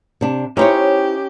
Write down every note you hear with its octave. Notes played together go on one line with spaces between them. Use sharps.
C3 D4
C#4 D#4 E4 G4 C5 C#5